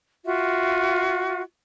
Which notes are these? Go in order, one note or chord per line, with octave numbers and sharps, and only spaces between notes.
F4 F#4 E5